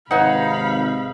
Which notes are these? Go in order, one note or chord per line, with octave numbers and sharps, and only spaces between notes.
G#1 C3 D#4 B4 C#5 F5 F#5 B5